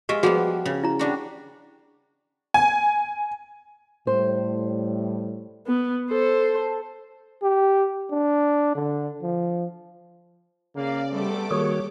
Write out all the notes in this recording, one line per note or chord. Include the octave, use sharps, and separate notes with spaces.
G#3 F4 G4 E5 C#6
F3 G3 B3 F#4 G#4 F#5
C#3
E4 A#5
G3 D4 F#4
G#5
A2 G3 C5
B3
A4 C5
G4
D4
D3
F3
C#3 A#3 D5 F5
C3 G3 A3 B3 A4 D6
D#3 A#3 F#4 G#4 C#5